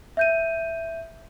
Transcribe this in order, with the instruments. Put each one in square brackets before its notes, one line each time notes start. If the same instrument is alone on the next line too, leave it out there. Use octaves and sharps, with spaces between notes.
[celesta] E5 G6 D#7